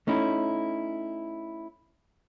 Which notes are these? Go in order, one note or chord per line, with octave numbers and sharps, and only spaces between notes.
A3 C#4 D#4 E4